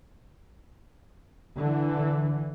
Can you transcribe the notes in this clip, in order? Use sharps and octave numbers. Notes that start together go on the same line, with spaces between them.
D3 E3